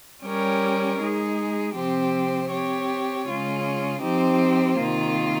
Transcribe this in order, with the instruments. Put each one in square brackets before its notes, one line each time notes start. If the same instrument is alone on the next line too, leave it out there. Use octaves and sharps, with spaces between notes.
[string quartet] G3 C#4 G4 A#4 C#5
G#3 D#4 G#4
C3 F3 C4 G4 C5
C4 G4 C#5
C#3 G#3 C#4 F4
F3 C4 D#4 G4 C5
C3 D#3 A#3 F4